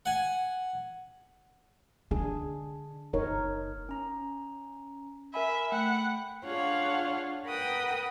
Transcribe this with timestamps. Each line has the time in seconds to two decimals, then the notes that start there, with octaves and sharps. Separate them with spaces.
0.06 F#5 G#5
2.11 D3 D4 G#4
3.13 F#1 D#4 A#4 C#5
3.89 C#4 A#5
5.34 A#4 E5 G#5 B5
5.72 A3 F#5 G5 B5
6.45 D4 F4 G#4 C#5 F5 F#5
7.46 A#4 B4 F#5 G5 D#6